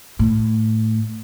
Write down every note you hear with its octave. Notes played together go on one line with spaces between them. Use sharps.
A2